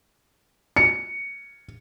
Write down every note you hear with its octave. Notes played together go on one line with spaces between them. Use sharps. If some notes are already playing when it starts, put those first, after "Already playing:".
C#7